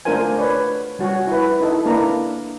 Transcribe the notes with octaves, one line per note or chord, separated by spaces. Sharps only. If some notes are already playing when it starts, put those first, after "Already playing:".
A3 D4 F4 A#4 C5 G#5
B4 C#5 D5
G3 F#4 C#5 G#5
E4 B4
D#4 E4 A4 D#5
A#3 D4 E4 B4 A#5